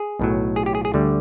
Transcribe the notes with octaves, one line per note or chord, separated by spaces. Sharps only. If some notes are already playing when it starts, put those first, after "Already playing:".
Already playing: G#4
B1 A2 F#3
G#4
G4
G#4
G#4
D2 D3 G3